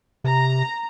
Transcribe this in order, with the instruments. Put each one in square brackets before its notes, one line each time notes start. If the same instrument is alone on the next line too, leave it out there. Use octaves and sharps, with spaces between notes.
[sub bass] C3 [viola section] A#5